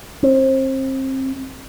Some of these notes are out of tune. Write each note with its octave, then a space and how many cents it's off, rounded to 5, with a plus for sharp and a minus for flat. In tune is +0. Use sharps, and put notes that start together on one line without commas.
C4 +30